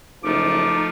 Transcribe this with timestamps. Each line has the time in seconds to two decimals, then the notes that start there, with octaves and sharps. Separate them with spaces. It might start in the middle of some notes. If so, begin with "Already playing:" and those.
0.24 F#1 F3 A3 D#4 D6